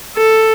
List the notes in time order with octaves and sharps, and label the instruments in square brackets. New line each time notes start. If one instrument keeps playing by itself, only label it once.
[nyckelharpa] A4